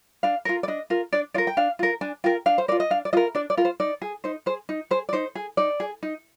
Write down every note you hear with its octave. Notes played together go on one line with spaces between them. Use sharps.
D4 F5
F4 A#4
D5
D4 D#5
F4 A#4
D4 D5
F4 A#4 D5
G5
D4 F5
F4 A#4
D4 G#5
F4 A#4 G5
D4 F5
C5
F4 A#4 D5
D#5
D4 F5
D5
F4 A#4 D#5
D4 D5
D5
F4 A#4
C5
D#4 D5
G#4
D#4 C5
G#4 C5
D#4
G#4 C5
D5
D#4 C5
G#4
D#4 D5
G#4
D#4